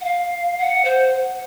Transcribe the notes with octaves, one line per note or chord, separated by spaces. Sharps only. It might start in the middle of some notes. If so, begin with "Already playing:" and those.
F#5
F5
F#5
C5